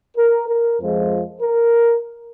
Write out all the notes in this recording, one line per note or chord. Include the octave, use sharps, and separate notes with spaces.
A#4
A#4
F2 F3 G#3
A#4